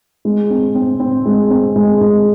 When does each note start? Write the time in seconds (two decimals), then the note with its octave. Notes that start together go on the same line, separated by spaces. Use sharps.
0.25 G#3
0.50 C4
0.75 C4
1.00 C4
1.26 G#3
1.50 C4
1.76 G#3
2.01 G#3